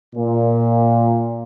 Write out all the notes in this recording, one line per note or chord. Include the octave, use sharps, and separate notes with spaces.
A#2